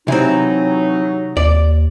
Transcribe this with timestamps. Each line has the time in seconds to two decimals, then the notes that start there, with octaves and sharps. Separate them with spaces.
0.08 C3 E3 F#3 C4 D#4
1.37 D#2 D5